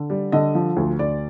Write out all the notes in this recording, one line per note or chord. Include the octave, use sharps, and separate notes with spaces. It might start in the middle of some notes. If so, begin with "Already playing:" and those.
Already playing: D3
G3
D3 D#5
F3
D2
D2 D5